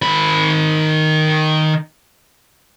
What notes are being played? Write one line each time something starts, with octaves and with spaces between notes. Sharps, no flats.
D#3 B5